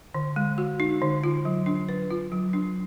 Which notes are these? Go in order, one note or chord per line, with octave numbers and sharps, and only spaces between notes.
D3
G#3
F#4
D#4
D3
F4
F#3
D4
B4
F4
F#3
D4